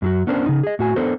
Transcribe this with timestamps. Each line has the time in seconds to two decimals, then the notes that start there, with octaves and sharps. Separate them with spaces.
0.02 F#2 F#3 F#4
0.27 B3 C#4 D4 A#4 C5
0.46 C#3 D#4
0.63 G#4 D#5
0.79 A2 F#4 G#5
0.96 B3 D4 A4 A#4 C5